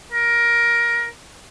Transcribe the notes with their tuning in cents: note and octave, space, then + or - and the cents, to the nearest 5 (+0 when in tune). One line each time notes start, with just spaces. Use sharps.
A#4 +15